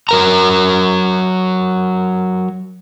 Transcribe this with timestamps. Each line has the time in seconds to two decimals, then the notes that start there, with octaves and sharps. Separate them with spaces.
0.09 F#3 A#4 A#5